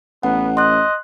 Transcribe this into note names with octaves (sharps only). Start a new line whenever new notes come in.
A1 B3 F#5
D#5 C6 F#6